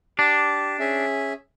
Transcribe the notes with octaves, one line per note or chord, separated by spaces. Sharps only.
D4 G4
C#4 G#4 E5